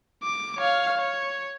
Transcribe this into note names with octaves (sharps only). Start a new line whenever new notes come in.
D6
C#5 F5
C#5